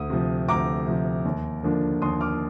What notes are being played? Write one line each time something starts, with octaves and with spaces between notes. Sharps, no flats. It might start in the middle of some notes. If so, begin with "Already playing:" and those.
Already playing: D2 D#6
C3 F3
D2 A#5 D6
C3 F3
D#2
D3 F3 A#3 D4
D#2 C6 D#6
D6 F6